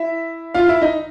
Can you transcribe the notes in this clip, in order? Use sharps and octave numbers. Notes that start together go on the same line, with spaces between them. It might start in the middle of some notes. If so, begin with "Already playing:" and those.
Already playing: E4 E5
F4 F5
E4 E5
D#4 D#5